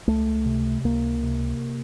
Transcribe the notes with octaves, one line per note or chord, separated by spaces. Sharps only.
C#2 A3
C3
C#2 A#3
C3